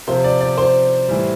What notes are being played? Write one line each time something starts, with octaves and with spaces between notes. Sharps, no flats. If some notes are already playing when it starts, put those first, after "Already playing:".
C3 F3 C5
D5
D5
C5
A2 E3 G3